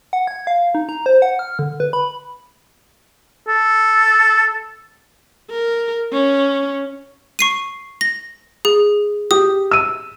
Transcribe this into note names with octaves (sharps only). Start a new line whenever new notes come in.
F#5
G#6
F5
D#4
A#5
C5
F#5
F6
D3
B4
B5
A4
A#4
C#4
C#6 C7 D#7
A#6
G#4
G4 D#6
E6 D#7